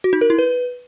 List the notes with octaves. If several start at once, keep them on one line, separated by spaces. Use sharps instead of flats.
F#4
D#4
A#4
E4
B4